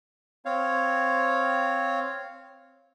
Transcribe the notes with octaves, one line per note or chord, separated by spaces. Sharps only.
C4 C#5 F5